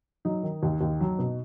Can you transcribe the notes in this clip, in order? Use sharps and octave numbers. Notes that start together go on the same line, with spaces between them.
F#3 D#4
D#3
D#2
D#2
F#3
B2